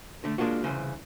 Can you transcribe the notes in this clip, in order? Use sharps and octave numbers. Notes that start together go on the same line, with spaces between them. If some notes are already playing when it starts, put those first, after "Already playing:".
D3 A3
G#3 A#3 D4 F4 F#4
C2 C#3 E3 C5